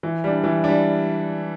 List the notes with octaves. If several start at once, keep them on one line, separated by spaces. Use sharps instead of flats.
E3
G3 D4
E3
G3 D4